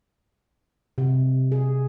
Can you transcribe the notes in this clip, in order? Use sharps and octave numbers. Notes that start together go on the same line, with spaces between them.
C3
G#4